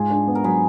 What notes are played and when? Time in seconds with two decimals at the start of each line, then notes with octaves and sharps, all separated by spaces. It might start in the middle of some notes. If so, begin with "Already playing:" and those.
Already playing: G#2 F4 G#4
0.10 D4
0.27 B3
0.35 A#4
0.44 F#3 G#4 B4